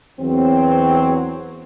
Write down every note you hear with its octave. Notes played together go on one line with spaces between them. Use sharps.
E2 F#3 C4